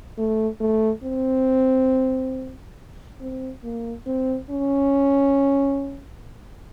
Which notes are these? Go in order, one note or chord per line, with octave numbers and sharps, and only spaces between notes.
A3
A3
C4
C4
A#3
C4
C#4